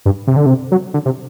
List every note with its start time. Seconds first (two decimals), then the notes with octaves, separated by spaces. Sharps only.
0.05 G2
0.27 C3
0.36 D3
0.46 C3
0.71 F#3
0.94 D3
1.05 C3